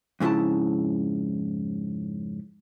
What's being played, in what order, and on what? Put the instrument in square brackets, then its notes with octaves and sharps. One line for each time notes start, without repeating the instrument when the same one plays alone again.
[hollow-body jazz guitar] F2 G#2 C#3 E4 A5